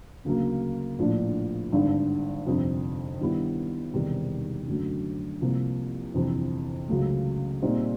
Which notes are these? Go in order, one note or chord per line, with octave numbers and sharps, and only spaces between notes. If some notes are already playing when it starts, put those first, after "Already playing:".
D2 C#3 F#3 A#3
A#1 A2 F3 A#3 D4
G#1 G2 D3
G1 F2 C3
G2 D#3 G3 B3 E4
E1 E2 C3 D#3 G3
F#2 D3 F#3 A3
C2 C3 F3 A#3
G1 F2 C3 E3
C#2 C#3 F#3 A3
A#2 G3 C4 D#4